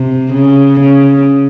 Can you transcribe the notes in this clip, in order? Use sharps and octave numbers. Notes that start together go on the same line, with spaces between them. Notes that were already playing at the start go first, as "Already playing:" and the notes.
Already playing: C3
C#3
C#3